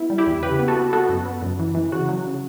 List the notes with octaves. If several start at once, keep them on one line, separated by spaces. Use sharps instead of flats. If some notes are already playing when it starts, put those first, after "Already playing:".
Already playing: B3 E4
G3
E4 G4
E2
C#3 G4 B4
B3
F#4 A4
B3
B3 F#4 A4
F#2
B3
F#2
E3
E3
C#3 F#4
F#3
C#3